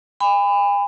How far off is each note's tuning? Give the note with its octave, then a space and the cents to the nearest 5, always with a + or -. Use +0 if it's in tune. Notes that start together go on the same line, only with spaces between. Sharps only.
G#5 -45 B5 +25